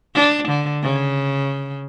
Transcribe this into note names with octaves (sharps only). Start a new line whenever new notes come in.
D4
D3
C#3